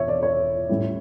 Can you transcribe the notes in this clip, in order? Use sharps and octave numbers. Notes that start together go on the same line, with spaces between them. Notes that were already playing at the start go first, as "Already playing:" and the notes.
Already playing: E1 C#5 E5
D5
C#5
A2 G3 C#4 E4